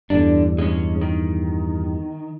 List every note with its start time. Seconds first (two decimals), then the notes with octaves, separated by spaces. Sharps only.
0.10 E2 G2 D3 D4
0.58 G#3 C#4
1.01 D#3